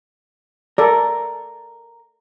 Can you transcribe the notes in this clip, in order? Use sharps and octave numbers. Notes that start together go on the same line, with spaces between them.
A4 A#4 D5